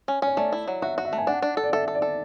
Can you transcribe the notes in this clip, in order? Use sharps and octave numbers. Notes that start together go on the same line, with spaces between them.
C#4
C#4 C#5
A3 D5
E4
F#3
F#4 E5
F#4
E5
A3
G#5
D4 F#5
D4
A4
D5
A4 E5
A4
D5
A4